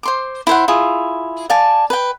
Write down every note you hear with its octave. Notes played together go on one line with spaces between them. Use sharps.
C5 C6 D6
E4 C5 F#5
E4 F4 G#4
D5 F5 G#5 A5
B4 G5